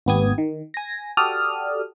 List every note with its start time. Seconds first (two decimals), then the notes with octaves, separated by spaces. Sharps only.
0.06 G#1 D#2 B3 G4 D#6 G#6
0.38 D#3
0.74 G#5 A#6
1.17 F#4 G4 A4 D5 D#6 F6